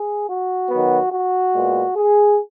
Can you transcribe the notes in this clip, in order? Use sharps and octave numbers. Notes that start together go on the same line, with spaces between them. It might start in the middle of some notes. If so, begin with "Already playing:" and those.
Already playing: G#4
F#4
D#3 F#3 B3
F#4
A#2 G#3 B3
G#4